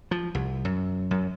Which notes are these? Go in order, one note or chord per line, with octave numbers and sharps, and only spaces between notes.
F3
C2
F#2
F#2